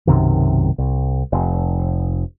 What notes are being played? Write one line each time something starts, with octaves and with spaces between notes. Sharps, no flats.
B1 F#2 C3 D#3
C2
F1